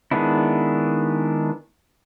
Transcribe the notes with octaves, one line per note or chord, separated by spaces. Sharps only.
D#3 G#3 B3 D4 E4